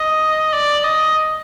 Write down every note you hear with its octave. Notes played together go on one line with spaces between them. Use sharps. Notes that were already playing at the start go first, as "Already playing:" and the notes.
Already playing: D#5
D5
D#5